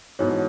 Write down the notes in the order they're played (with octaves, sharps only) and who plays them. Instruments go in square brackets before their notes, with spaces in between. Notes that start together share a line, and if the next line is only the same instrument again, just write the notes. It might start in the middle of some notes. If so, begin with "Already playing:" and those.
[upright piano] G#2 E3 B3 F#4 A4 [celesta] C#5